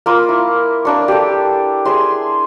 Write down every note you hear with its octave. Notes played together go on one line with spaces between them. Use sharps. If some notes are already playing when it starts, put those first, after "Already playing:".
A#3 F4 B5 D6
E4
A#3 D4 C#6
G4 A4
G#4 E5 C6